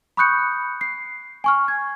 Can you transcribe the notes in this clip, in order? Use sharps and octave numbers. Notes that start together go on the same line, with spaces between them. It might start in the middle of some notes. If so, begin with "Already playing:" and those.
B5 C#6 D#6 F#6 G6 C#7
C7
G#5 C#6 F6
G#6